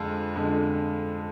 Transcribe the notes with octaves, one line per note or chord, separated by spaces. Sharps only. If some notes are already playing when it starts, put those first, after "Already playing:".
Already playing: F2 D3 G#3
F2 D3 G#3